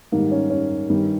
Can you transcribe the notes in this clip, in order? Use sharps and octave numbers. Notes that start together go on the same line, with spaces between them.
G#2 D#3 G3 A#3
C#4
C#4
G2 D#3 G3